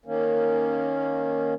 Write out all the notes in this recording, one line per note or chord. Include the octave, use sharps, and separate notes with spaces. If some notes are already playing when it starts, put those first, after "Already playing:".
D#3 A#3 C#4